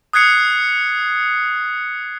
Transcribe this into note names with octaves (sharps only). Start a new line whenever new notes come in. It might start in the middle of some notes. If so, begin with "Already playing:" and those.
D#6 F#6 G#6 C7 C#7